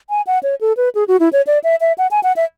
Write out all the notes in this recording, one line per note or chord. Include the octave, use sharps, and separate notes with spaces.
G#5
F#5
C#5
A4
B4
G#4
F#4
E4
C#5
D5
E5
E5
F#5
G#5
F#5
E5